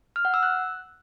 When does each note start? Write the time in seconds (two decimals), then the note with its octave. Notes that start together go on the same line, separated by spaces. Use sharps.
0.16 F6
0.25 F#5
0.34 E6
0.43 F#6